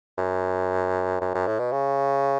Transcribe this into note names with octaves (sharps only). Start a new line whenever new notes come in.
F#2
F#2
F#2
A2
B2
C#3